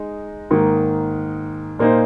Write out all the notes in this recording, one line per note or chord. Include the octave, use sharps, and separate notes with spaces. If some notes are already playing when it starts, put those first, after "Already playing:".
Already playing: G#3 D#4
G#2 D#3 A#3
A#2 A#3 D#4 C5